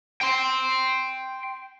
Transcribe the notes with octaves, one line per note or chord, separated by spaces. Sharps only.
G5 C6